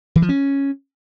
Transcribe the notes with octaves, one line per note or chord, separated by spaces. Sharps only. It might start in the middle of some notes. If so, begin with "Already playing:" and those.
E3
F3
C#4